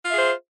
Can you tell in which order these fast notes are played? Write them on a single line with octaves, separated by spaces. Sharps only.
F4 E5 G#4 C5